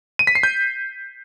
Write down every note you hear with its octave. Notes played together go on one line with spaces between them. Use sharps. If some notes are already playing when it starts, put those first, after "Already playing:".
D#7
B6
C7
G6